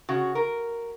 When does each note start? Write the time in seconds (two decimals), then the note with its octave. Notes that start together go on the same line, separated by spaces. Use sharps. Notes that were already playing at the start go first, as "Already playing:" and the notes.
0.09 C#3 F#4
0.35 A#4